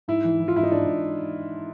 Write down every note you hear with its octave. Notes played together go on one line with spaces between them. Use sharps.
G#2 E4
E3
E3
F4
G#2 E4
D#4
G#2 D4
G#2